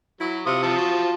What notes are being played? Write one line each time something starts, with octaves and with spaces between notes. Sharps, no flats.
F#3 E4
C3 F4 D#6
F3 F4 A5
F#4